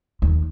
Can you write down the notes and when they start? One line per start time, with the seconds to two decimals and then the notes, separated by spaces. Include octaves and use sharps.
0.22 D#2